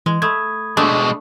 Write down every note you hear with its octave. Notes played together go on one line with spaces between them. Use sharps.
E3 G#3
A3 B5 D#6 G#6
B2 G#3 A3 D4